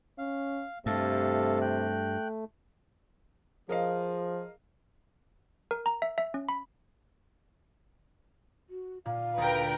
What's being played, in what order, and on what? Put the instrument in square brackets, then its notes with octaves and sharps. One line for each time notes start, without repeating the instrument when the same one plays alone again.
[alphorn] C#4 [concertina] F5
[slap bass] G2 [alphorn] C3 [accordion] A3 [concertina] A4 F5
[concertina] G5 F#6
[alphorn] F3 [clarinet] G#4 [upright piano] A#4 D#5 F5
[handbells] A#4
A#5
E5
E5
C#4
B5
[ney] F#4
[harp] A#2 [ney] F5
[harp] D2 [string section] A#4 B4 G5